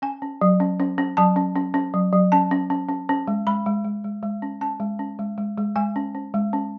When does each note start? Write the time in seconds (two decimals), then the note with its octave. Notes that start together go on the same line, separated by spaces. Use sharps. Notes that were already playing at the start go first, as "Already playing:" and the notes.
0.02 C#4 G#5
0.22 C#4
0.41 F#3
0.60 C#4
0.80 C#4
0.98 C#4
1.17 F#3 A5
1.36 C#4
1.56 C#4
1.74 C#4
1.94 F#3
2.13 F#3
2.32 C#4 A5
2.51 C#4
2.70 C#4
2.89 C#4
3.09 C#4
3.28 G#3
3.47 G#3 B5
3.66 G#3
3.84 G#3
4.04 G#3
4.23 G#3
4.42 C#4
4.61 C#4 A5
4.80 G#3
4.99 C#4
5.19 G#3
5.38 G#3
5.58 G#3
5.76 G#3 G#5
5.96 C#4
6.15 C#4
6.34 G#3
6.53 C#4